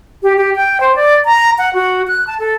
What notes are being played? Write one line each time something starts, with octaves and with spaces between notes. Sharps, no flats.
G4
G4
G5
C5
D5
A#5
F#5
F#4
F#6
A5
A4